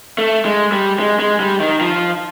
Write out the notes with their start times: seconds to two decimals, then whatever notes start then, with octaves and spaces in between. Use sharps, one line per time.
0.18 A3
0.45 G#3
0.72 G3
1.00 G#3
1.20 G#3
1.40 G3
1.60 D#3
1.81 F3